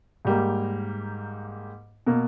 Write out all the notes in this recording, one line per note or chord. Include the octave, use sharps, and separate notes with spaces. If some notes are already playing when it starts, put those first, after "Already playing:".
G#2 G3 A#3
B2 A#3